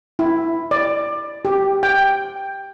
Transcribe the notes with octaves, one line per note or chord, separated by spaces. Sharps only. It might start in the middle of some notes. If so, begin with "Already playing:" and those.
E4
D5
G4
G5